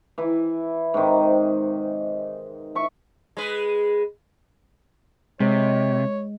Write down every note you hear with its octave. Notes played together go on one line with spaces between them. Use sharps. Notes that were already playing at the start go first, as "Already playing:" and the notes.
E3 E4
G#2 C3 D#3
E5 C#6
G#3 B4
C3 G#3 C#5